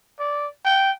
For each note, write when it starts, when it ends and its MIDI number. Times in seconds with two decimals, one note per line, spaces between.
0.20 0.47 74
0.65 0.91 79